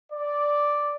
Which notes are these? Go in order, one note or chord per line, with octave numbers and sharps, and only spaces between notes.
D5